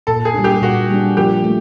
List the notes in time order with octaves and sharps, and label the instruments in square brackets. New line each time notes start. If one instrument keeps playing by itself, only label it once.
[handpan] A#2 [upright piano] A4
[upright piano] G#4
[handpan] G3 A#3 D4
[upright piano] G4
[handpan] A#2 [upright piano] F#4
[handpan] G3 A#3 D4
[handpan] F3 [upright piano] G4
[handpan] A3